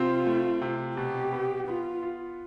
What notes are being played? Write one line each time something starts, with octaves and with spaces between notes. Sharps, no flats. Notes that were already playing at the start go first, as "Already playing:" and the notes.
Already playing: C3 C4 F4
A3
C3
B2 G4
B3
B3 F4
F4